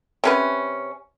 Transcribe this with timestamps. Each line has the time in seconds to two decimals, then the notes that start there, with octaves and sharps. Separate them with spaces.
0.24 C3 C#4 B4